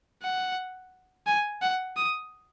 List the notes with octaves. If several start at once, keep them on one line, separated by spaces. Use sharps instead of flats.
F#5
G#5
F#5
D#6